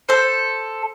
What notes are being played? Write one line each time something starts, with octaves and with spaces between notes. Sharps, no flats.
A4 C5